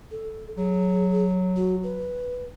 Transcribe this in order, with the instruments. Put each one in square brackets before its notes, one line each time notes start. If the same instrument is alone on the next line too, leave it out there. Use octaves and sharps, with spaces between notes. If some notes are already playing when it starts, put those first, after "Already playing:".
[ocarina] A4
[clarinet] F#3 [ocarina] G#4
[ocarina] F#4
B4